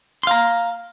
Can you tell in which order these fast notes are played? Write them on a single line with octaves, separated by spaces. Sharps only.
C6 F5 A#5